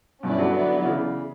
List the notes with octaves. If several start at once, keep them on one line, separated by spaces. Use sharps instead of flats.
G2 B2 C#4 E4 B4 D5
D3 F#3
B3 E4 B4 D5
F#3
C#3 E3